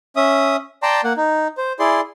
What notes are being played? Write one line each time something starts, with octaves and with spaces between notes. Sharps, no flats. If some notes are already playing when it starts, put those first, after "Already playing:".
C#4 E5 D#6
D5 G5 A5 A#5 C6
A#3 F#5
D#4
C5
E4 G#4 D5 C6